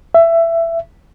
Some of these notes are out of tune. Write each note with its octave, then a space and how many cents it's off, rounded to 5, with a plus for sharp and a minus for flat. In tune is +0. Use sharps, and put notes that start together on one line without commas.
E5 +15